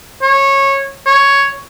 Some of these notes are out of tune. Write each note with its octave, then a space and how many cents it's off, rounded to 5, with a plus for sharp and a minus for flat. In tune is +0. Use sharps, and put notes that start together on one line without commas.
C#5 -15
C#5 +5